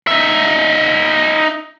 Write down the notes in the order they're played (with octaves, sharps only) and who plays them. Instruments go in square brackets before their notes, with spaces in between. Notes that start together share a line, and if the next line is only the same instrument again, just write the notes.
[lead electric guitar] D#4 E5